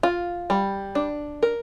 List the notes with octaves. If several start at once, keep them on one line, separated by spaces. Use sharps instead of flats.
F4
G3
D4
A#4